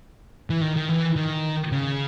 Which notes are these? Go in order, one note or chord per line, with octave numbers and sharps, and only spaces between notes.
E3
D#3
D#3
E3
D#3
C#3